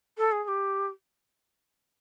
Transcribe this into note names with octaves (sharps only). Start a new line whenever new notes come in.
A4
G#4
G#4
G4